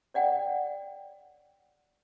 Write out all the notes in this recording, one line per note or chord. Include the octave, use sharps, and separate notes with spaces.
C#5 D5 F#5 G5